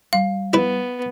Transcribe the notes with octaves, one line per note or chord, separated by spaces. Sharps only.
G3 F5
B3 E4 B4